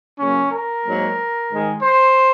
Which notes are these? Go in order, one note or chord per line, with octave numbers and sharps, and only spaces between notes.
C#3 F#3 A#3 C#4
A#4
G#2 F#3 A#3
G#2 D#3 G#3
C5